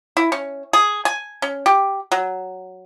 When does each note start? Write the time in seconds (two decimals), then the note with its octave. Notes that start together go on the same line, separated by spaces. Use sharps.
0.17 E4
0.32 C#4
0.73 G#4
1.05 G#5
1.42 C#4
1.66 G4
2.12 F#3